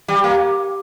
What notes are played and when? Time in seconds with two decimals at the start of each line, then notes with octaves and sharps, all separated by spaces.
0.08 G3
0.24 A#3